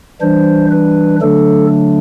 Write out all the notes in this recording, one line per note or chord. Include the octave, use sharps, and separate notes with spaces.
E3 G3 D4 C5
B4
D3 F#3 A3 D4 A4